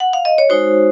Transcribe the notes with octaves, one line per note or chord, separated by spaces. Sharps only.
F#5
F5
D#5
C#5
G#3 D#4 F#4 C5